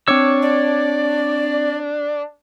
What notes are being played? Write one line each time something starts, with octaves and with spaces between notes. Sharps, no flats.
C4 D4 C#5 D6 E6 C#7
D5